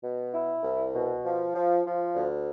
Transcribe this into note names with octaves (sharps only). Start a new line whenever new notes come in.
B2
E4
C2
B2
F3
F3
F3
D2